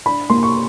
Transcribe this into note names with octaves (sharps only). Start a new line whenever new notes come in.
D4 B5
A#3 C6
C#6